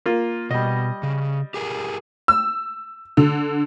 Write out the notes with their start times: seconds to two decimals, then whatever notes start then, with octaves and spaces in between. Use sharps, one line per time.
0.06 A#3 F4
0.51 B2 G3 D#5
1.03 C#3
1.54 G4 G#4 A#4
2.28 E6
3.17 D3